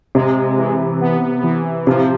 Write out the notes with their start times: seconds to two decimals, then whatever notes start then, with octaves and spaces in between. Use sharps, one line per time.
0.15 C3 G#3
0.58 E3
1.01 B3
1.44 E3
1.87 C3 F3